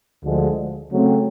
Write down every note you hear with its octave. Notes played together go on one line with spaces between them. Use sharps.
D2 D3 F3 G#3
C#3 F#3 A3 C4